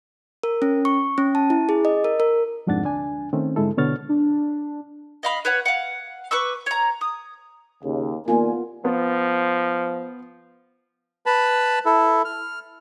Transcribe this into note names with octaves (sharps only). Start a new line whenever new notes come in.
A#4
C#4
C#6
C#4
A5
E4
G#4
D#5
A#4
A#4
C2 F2 G#2 D4 F#5 A6
D2 D4 G#5
D#3 A3 C4 C#4
G#2 D3 G#3 E4 A4
B2 D3 B3 C#5 F6 A6
D4
D#5 F5 B5
B4 C#5 F#5
F5 F#5
B4 C#6 D6 E6
C#5 A#5
D#6
D#2 C#3
D#2 A#3 B3 F4 D5 G#5
F3 B3
B4 A5 B5
E4 A4
F6